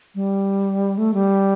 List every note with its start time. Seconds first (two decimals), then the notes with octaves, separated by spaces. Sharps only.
0.15 G3
0.98 A3
1.14 G3